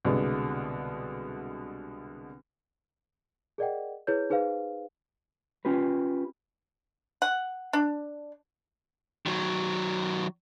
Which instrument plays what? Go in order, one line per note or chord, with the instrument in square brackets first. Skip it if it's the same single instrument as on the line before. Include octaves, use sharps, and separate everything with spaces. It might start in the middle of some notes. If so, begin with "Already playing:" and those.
[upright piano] C2 B2 D3 G#3
[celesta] G#4 A#4 D5 D#5 F#5 G5
E4 G#4 B4 C#5 G6
D#4 G#4 B4 C5 F5
[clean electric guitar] C#4 F4 G4 B4
[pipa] F#5
D4
[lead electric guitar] D#3 F#3